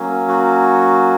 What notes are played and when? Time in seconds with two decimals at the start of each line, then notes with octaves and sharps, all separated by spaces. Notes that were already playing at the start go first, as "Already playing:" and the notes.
Already playing: F#3 A#3 C#4
0.28 F#4